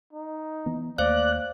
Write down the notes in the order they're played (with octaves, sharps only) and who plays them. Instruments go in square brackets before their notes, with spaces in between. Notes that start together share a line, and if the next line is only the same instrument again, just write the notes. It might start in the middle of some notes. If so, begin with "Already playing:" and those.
[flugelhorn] D#4
[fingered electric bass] E3 B3
[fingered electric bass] D#2 A3 A#3 [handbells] C5 F5 [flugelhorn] D5 [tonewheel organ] F#6